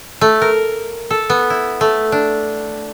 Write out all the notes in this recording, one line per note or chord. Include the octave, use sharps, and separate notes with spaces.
A3
A#4
A4
B3
E4
A3
D4